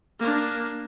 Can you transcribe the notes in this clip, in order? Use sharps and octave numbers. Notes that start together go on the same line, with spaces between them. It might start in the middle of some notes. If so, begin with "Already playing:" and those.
A#3 D4